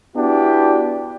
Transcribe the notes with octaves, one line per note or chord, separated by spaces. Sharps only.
B3 D4 E4 F#4 G4